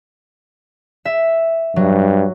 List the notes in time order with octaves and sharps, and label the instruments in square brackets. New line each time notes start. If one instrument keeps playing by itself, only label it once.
[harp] E5
[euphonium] G2 [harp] F#3